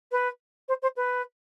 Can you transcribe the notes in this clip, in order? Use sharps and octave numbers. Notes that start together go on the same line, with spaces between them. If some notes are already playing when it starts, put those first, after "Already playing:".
B4
C5
C5
B4